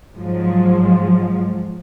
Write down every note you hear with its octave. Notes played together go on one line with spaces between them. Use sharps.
G#2 F3 F#3 G#3